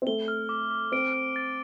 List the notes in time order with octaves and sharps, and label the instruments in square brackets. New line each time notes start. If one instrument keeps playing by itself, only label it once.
[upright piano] C4
[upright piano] A3 [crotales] G7
[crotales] F6
D6
D6
[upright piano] C4 [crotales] D7
[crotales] F6
A6